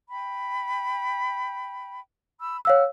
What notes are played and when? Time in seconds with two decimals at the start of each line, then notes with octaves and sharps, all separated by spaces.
0.10 G5 B5
2.41 B5 E6
2.65 C#5 F5 F#5 E6 F6